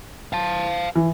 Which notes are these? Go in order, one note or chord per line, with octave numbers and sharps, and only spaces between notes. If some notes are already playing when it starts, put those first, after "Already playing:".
F5 A5
E3